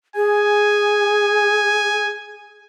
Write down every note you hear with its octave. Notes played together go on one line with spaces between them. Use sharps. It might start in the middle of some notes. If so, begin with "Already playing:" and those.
G#4 G#5